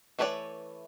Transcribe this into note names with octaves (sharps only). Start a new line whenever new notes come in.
E3 A3 B4 C#5 D5